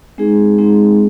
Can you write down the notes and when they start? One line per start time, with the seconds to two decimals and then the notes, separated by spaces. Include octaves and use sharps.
0.18 G#3 C4 D#4 G#4
0.58 G#3 C4 D#4 G#4